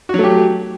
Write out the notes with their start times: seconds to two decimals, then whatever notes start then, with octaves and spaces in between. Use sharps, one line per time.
0.09 F#4
0.14 F#3
0.19 A3
0.24 G4